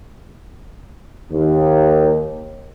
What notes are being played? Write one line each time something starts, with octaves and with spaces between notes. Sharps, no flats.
D#2